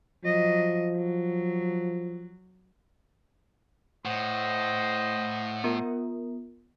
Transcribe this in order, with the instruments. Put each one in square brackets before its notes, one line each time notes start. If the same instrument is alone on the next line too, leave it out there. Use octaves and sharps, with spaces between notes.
[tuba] F3 [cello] F#3 D#5
[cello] F#3
[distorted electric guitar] A2 [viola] C5 D#5 [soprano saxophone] F#5
[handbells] B3 F4 A#4